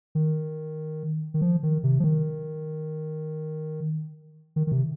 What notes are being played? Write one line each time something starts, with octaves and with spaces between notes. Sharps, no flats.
D#3
D#3
F3
D#3
C3
F3
D#3
D#3
D#3
C3